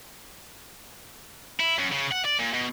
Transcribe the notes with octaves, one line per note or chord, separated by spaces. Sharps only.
E4
F#2
C#3
F#5
D5
A#2
B2